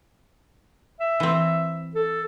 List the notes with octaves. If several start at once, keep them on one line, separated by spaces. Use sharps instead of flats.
E5
E3 C4
A4